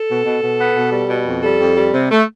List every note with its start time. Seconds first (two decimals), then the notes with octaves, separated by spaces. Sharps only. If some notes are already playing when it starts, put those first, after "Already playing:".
Already playing: A4
0.09 B2
0.25 B2
0.42 B2
0.59 B3
0.75 B2
0.92 G3
1.10 B2
1.25 F2
1.43 G3 A4
1.59 F2
1.76 G3
1.93 C3
2.10 A3